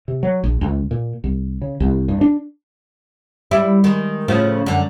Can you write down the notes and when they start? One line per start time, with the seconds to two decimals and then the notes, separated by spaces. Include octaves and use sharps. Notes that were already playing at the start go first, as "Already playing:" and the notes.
0.08 C3
0.23 F#3
0.44 A#1
0.61 C#2
0.91 A#2
1.24 C2
1.62 C#3
1.80 C2
2.08 G2
2.21 D4
3.51 G3 E4
3.84 D#3 G#3
4.28 A2 C#3 F3
4.66 F#2 D3